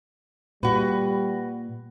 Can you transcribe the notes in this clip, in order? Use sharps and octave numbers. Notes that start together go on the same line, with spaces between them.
A#2 G3 F#4 B4